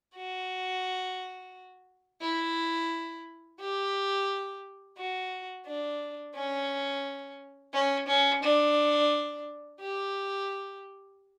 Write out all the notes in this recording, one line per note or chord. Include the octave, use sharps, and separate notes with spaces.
F#4
E4
G4
F#4
D4
C#4
C#4
C#4
D4
G4